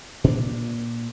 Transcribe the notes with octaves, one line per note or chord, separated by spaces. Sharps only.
A#2 C4 D4